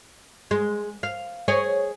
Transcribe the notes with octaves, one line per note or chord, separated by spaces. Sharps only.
G#3
F5
G#4 C#5 D#5